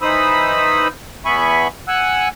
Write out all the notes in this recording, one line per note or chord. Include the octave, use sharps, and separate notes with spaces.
E3 D#4 C5 B5 D#6 E6
E2 B3 E5 G#5 B5 C#6
F#5 G#5 E6 F#6